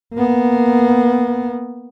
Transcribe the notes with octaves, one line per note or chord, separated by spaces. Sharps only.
A#3 B3